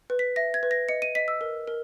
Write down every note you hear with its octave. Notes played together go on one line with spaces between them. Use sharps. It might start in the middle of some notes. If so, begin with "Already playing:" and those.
B4
B6
E5 A#6
G#6
B4
A#6
D#5 C#7
D#7
D#5 B6
E6
A#4
A#4